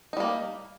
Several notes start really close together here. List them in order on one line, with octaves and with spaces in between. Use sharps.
D#4 G3 A#3